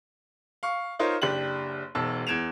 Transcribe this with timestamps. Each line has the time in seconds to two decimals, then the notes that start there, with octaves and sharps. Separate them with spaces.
0.63 F5 C#6
0.99 D#4 F4 A#4 C5 C#5
1.22 F#1 D4 G4 F#7
1.95 E1 B1 A5 E6
2.27 E2 G#6 D7 E7 F7